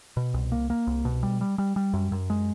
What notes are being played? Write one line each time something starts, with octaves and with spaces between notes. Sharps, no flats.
B2
C2
A#3
A#3
C2
B2
G3
G3
G3
G3
F#2
F#2
G#3